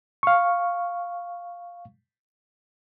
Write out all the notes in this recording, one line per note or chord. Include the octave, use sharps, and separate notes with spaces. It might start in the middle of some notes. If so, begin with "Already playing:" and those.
F5 C#6